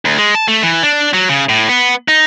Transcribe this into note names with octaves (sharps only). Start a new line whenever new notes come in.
D2
G#3
A5
A3
E3
D4
F#3
C#3
A2
B3
D#4